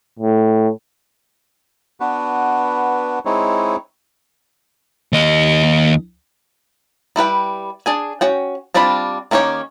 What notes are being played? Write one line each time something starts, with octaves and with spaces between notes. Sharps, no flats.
A2
B3 D4 F#4 B4
G#3 C4 D#4 E4 C#5
D#2 D#5
G3 E4 B4 G5
D4 G#4 G#5
C#4 F#4 G5
G3 C4 D4 F4 B5
D#3 A#3 C#4 G4 C#5